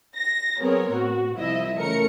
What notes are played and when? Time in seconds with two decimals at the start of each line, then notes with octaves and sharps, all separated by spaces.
0.15 A#6
0.60 F#3 B3 C4 G#4 A#4 C#5
0.92 A2 F#4
1.37 C2 F3 E4 D#5 E5
1.77 C#3 E3 A3 A#4 C#7